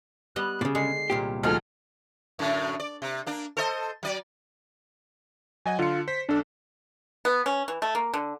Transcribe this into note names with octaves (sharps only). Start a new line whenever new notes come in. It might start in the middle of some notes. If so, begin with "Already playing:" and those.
G3 B3 D#5 F#6
A#2 C#3 D5
D3 G#3 C7
C2 A#2 G4
D2 F3 D#4 G#4 A4 F6
F#2 A2 D3
D5
C3
A#3 D4
A4 C5 D#5
F#3 D5
F#3 D#5 F#5 G#5
D3 F4 C#7
C5 B6
B1 D4 A4
B3
C#4
E3
A3
A#3
D3